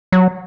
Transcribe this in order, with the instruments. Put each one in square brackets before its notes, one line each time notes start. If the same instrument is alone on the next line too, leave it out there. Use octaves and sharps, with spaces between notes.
[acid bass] F#3